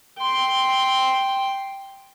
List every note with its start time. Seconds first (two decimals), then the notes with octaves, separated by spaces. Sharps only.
0.19 G5 C6